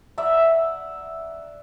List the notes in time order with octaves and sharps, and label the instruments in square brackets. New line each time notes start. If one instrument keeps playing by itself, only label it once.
[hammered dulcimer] D5 E5 F#5 A#5